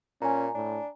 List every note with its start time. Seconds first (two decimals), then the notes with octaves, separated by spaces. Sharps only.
0.22 A#2 C#4 G#5 A#5
0.55 A2 D4